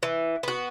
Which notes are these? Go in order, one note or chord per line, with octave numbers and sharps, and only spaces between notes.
E3
B3 F#4